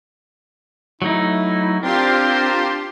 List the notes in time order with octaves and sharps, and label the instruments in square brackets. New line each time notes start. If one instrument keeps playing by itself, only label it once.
[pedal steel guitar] F#3 A3 D#4 [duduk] E4
[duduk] C4 [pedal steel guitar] D4 [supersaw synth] F4 G4 C6 [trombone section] A#4 C5